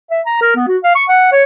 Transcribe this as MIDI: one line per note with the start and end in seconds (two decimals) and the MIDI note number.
0.11 0.20 76
0.26 0.40 82
0.41 0.51 70
0.56 0.65 59
0.68 0.77 66
0.84 0.93 77
0.95 1.03 85
1.08 1.28 78
1.32 1.44 73